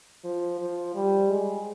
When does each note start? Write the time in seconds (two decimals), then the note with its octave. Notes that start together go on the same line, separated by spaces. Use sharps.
0.24 F3
0.60 F3
0.95 G3
1.30 G#3